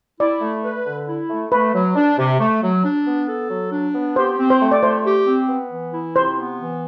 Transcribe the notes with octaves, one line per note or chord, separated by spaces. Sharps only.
E4 D5
A3
B4
D3
E4
A3
A3 B4
F#3
D4
C3
A3
F#3
D4
B3
A4
F#3
D4
B3
G4 C5
C4
C5
A3
D5
A3 C5
G4
C4
B3
E3
E4
C3 C5
B3
E3